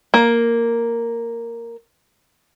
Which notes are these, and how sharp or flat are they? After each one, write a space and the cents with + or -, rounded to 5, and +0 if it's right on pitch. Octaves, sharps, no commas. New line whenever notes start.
A#3 -5